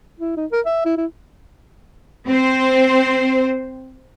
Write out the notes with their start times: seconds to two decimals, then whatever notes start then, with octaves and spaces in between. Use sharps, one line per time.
0.20 E4
0.37 D#4
0.52 A#4
0.66 E5
0.85 E4
0.98 E4
2.26 C4 C5